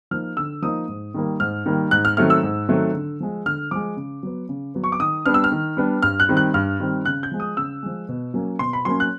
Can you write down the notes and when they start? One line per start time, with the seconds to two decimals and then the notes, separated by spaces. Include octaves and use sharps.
0.11 F3 A#3 D#4 F6
0.37 D3 E6
0.62 F3 A#3 D#4 D#6
0.88 G#2
1.14 D#3 G3 A#3
1.40 G#2 F6
1.66 D#3 G3 A#3
1.91 G#2 F#6
2.05 F6
2.17 D#3 F#3 A3 C4 F6
2.30 E6
2.43 G#2
2.69 D#3 F#3 A3 C4
2.94 D3
3.20 F3 G#3
3.45 D3 F6
3.71 F3 G#3 D6
3.97 C#3
4.23 F#3 B3
4.49 C#3
4.75 F#3 B3
4.84 C#6
4.92 D6
5.00 D#3 D#6
5.26 G3 B3 D4 F6
5.34 E6
5.44 F6
5.52 D#3
5.77 G3 B3 D4
6.02 G2 F6
6.20 F#6
6.29 D#3 G3 C4
6.37 F#6
6.54 G2 F6
6.80 D#3 G3 C4
7.05 C#3 F#6
7.23 G6
7.31 F3 G#3
7.40 D#6
7.57 C#3 E6
7.83 F3 G#3
8.09 B2
8.34 F#3 A#3 C#4
8.59 B2 C6
8.73 B5
8.85 F#3 A#3 C#4 C6
9.00 F#6